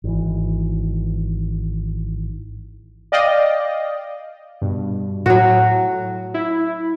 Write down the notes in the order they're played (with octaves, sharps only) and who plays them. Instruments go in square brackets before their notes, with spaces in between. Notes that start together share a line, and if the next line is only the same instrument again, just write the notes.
[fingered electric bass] G#1 E3
[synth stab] D5 D#5 F5 G5
[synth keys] G2 B2
[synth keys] A2 [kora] F#3 F#4
[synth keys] E4